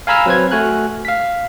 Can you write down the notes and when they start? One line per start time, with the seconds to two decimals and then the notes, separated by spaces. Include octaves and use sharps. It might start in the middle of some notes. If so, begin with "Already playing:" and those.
0.07 F5 G#5 A#5 B5 E6 F6
0.26 F#3 C4 B4 C5 G#6
0.51 A3 F#4 G#5 F6 F#6
1.05 F5 B6